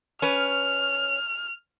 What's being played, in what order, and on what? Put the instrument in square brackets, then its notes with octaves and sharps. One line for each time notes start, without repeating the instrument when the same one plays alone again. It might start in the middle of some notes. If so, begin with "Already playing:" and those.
[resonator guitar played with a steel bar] C#4 B4 [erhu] F6